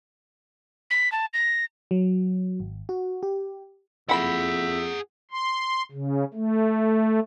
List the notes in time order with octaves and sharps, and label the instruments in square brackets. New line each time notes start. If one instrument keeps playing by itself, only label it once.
[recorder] B6
A5
A#6
[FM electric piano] F#3
G#1
F#4
G4
[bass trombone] F2 [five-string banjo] E4 B5 [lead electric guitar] G#4 F#5 [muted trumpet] E5
[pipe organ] C6
C#3
A3